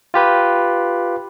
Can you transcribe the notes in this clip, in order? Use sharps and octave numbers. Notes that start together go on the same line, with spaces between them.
F4 G4 B4